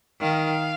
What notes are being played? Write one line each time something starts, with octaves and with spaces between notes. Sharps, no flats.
D#3 F5